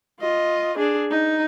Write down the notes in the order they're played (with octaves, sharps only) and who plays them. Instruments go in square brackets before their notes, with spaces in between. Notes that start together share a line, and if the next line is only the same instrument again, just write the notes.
[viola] F4 D#5
D4 G#4
D#4